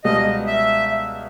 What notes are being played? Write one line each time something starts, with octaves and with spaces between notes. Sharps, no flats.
C#2 B2 G3 D#5
E5